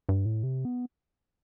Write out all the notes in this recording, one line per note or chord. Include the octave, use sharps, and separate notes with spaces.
G2
A2
C3
B3